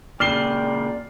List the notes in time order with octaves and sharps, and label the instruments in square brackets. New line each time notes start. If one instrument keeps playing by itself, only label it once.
[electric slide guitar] A#2 C#3 [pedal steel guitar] D5 [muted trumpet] G5 [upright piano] F6 C7 G7